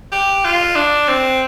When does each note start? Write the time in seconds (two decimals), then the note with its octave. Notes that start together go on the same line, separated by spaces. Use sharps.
0.12 G4
0.45 F4
0.76 D4
1.08 C4